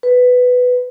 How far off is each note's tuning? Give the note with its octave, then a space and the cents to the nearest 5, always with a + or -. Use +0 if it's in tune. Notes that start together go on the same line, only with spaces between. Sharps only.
B4 +10